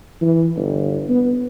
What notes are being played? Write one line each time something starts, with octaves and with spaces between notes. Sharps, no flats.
E3
G1
B3